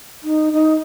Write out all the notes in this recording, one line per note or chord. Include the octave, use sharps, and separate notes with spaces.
D#4
D#4